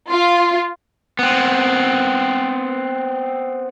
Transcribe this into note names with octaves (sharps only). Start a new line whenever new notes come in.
F4
B3 C4